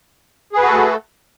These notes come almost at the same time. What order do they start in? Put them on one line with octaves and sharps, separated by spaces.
G#4 B4 F#4 A4 A3